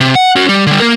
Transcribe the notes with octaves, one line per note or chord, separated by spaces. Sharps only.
C3
F#5
C#4 F#4
G3
D3 G3
A#3 A#4